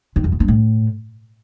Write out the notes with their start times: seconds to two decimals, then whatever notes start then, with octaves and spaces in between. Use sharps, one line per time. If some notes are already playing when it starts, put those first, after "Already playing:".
0.16 D#3
0.24 F2
0.32 D#3
0.40 G2
0.48 A2